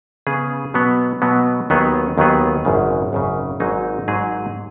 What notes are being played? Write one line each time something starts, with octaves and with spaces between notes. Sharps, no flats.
C#3 B3 G#4
B2 F#3 B3
B2 F#3 B3
D#2 D#3 F#3 B3 G#4
D#2 D#3 F#3 B3 G#4
G#1 F#2 C#3
G#1 F#2 C#3
G#1 G#2 F#3 D#4 G#4
G#1 G#2 F#3 D#4 G#4